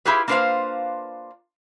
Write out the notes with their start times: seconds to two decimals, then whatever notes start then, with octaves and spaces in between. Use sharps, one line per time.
0.05 E4 F4 G4 G#4 B4
0.28 A#3 D4 F4 B4 C5 F5